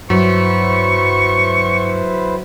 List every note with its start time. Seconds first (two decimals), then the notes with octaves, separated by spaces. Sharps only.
0.10 G2 F#3 E4 B4 C5 C#6